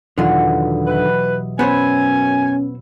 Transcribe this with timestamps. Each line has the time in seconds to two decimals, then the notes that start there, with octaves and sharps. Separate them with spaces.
0.18 E2 B2 D3 D#3 F#3 F4
0.87 E4 G4 B4 D#5
1.59 F#2 B3 C#4 C5 C#5 G#5 B5 E6